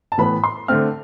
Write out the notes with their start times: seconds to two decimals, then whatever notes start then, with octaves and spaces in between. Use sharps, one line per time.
0.12 A5
0.18 A2 E3 B3 B5
0.44 C6
0.68 D3 A3 C4 F6